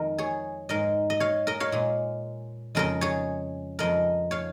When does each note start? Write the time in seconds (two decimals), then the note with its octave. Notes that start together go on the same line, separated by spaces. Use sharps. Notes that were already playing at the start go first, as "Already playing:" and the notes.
Already playing: F2 D#3 G#3 A#4 D#5
0.18 G#4 C#5
0.69 G#2 G#3 A#4 D#5
1.10 D#5
1.20 C#5 F5
1.47 A#4 D#5
1.60 C#5 F5
1.72 A#2 G#3
2.75 F2 C#3 G#3 A#4 D#5
3.01 G#4 C#5
3.79 F2 F3 G#3 A#4 D#5
4.31 C#5 F5